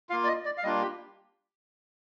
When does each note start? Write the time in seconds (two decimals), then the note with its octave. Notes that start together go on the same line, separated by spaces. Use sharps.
0.09 A#3 F4 F5
0.24 D5
0.27 D#5
0.45 D5
0.58 F5
0.63 G3 A#3 D4 F4 D#5
0.82 G4